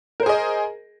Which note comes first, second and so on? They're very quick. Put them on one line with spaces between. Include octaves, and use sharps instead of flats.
A#4 C5 G#4 D#5